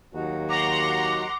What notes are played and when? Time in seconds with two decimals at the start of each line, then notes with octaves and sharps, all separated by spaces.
0.14 D#2 F#3 D#4 F#4
0.49 F#5 A#5 C6 D6